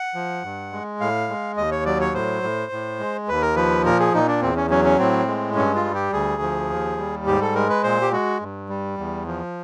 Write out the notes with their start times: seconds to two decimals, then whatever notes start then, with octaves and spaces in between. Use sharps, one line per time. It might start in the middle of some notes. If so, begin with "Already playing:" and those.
Already playing: F#5
0.15 F3
0.43 G2
0.72 G#3
1.00 A2 F5
1.29 G#3
1.57 D#2 D#5
1.71 C#5
1.86 F#3 D5
2.01 C#5
2.14 A2 C5
2.43 A2
2.72 A2
3.00 G#3
3.28 D#2 B4
3.42 A#4
3.55 F3 B4
3.85 A#2 A#4
4.00 G#4
4.14 A#2 D#4
4.28 D4
4.42 E2 C4
4.56 C#4
4.70 F#3 C#4
4.85 C#4
4.99 A2 C4
5.28 G#3
5.55 G2 C#4
5.75 F4
5.85 G3
5.94 G4
6.12 D2 G#4
6.42 F3
6.70 D#2
6.98 G3
7.27 G#2 G4
7.42 A4
7.55 G#3 A#4
7.70 B4
7.84 A#2 C5
8.02 G4
8.12 G#3 F#4
8.41 G2
8.69 G3
8.98 E2
9.26 F3